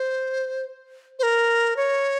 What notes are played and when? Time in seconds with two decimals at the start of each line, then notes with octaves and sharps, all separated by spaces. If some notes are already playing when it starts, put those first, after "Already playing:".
Already playing: C5
1.19 C5
1.23 A#4
1.77 C#5